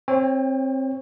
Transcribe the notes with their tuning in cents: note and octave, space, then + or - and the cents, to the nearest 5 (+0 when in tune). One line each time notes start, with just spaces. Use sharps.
C4 +15 C#5 +0 G5 +45